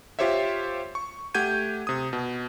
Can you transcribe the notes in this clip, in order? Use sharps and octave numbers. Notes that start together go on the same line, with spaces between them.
F4 G4 C5 C#5 E5
C#6
A3 G4 F#5 G6 G#6 D#7
C3 D#6
B2